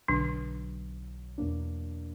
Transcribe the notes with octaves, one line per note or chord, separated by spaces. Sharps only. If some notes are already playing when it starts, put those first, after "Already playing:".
B1 B2 D3 F#3 D4
E2 B2 F#3 A#3 D4